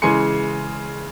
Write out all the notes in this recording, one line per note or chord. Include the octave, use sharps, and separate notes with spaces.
C#3 E3 G#3 G#5 C6 C#7